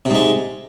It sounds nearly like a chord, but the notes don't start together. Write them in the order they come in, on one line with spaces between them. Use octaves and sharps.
C3 G#2 G#3